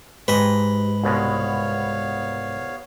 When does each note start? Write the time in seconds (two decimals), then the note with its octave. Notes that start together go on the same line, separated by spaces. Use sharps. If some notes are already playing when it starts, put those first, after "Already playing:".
0.28 G#2 G4 B4 D#5
1.04 C2 B2 G#3 B3 C#5 F5